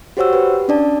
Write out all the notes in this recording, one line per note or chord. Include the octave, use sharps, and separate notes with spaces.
F#4 G4 C5 C#5 F#5 E6
G4 B4
C#4 D4 D5 A5